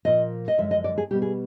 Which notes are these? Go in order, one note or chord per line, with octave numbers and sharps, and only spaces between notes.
A#2 F3 A#3 D#5
D#5
F#2 D3 F3 G#3 E5
D#5
D5
G#4
B2 G3 B3 G4
G#4